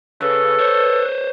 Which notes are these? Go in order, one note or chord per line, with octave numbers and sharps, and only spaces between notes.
C#3 A4 B4
C5 C#5